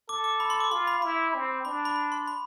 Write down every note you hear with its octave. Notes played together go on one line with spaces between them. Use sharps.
A4 D6
D6
B5
C6
D6
F4 C6
B5
E4 B5
C4
D4 B5
B5
B5
C6
B5